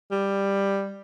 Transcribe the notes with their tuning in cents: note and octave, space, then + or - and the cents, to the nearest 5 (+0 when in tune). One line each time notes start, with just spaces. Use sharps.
G3 +10